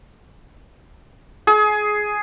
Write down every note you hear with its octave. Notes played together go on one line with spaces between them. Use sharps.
G#4